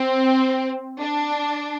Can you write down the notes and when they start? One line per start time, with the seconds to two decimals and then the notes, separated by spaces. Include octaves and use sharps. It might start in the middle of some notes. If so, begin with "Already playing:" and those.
Already playing: C4
1.01 D4